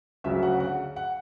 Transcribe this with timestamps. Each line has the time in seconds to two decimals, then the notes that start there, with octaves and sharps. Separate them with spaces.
0.24 D2 C#3 F#3 E5
0.43 F#5
0.60 F#5
0.96 F#5